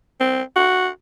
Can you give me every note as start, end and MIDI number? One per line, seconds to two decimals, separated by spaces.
0.20 0.42 60
0.56 0.88 66